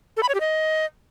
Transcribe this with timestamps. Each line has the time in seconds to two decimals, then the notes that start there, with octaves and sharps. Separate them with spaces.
0.17 A4
0.23 B5
0.29 C#5
0.35 G4
0.40 D#5